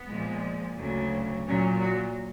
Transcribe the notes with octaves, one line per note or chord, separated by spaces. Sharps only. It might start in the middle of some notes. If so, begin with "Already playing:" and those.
Already playing: B3
A#2 F3 G#3
D2 C#3 F#3
A#2 F#3 C#4
F#4